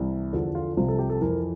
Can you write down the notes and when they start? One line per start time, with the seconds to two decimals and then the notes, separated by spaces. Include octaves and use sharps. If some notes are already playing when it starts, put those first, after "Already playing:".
Already playing: C2 C3 E3
0.33 E2 D3 F3 A4
0.55 F4
0.77 C2 C3 F3 F4
0.89 A4
0.99 G4
1.10 A4
1.21 F2 E3 A#4